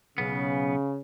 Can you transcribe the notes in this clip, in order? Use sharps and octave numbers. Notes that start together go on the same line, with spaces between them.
B1 C#3 B3